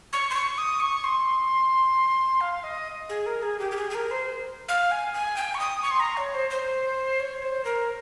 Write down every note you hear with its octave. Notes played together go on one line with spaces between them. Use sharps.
C#6
C6
C#6
D#6
C#6
C6
F5
D#5
G#4
A#4
G#4
G4
G4
G#4
G#4
A#4
C5
F5
G#5
G#5
G5
C#6
D#6
C#6
C6
A#5
C#5
C5
C5
C#5
C5
A#4